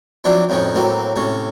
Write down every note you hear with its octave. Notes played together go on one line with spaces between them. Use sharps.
F3 F#3 C4 D4 E4
F2 A2 D#3 F3 C#4
A2 F#3 A#3 C4
A2 C3 C#4